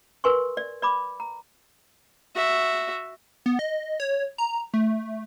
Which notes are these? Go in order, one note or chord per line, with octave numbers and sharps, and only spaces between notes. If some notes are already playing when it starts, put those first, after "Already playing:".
A#4 B4 G#5 C6 C#6
D5
D5 B5 D6
A#5
F#4 E5
B3
D#5
C#5
A#5
A3